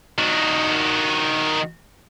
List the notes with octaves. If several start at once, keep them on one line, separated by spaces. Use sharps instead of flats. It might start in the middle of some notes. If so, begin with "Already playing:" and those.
D#3 F#4